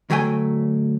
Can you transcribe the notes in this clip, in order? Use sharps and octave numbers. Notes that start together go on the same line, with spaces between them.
D2 F#3 A3 G5 G#5